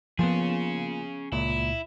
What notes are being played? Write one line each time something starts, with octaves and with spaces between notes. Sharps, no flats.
F3 A#3 B3 C#4 F4 G#4
C#2 A#2 E4